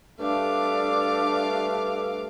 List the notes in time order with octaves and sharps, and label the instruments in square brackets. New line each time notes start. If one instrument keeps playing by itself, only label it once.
[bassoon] G2 [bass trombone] A3 [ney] D4 [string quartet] F5 D6